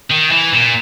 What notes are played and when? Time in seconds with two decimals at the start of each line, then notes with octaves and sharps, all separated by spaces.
0.11 D#3
0.32 E3
0.54 A#2